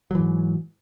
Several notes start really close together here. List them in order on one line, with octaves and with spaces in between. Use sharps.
F#3 E3 G#2